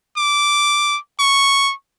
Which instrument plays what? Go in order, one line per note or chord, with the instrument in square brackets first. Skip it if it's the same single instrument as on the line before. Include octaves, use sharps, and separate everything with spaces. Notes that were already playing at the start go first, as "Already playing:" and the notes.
[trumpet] D6
C#6